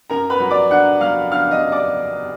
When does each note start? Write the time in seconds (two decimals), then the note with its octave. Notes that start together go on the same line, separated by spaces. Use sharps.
0.10 F#2 A#4 A#5
0.30 B4 B5
0.40 F#3
0.51 D5 D6
0.71 D4 F#5 F#6
1.00 F#3 F5 F6
1.31 D4 F5 F6
1.51 D#5 D#6
1.61 F#2
1.72 D5 D6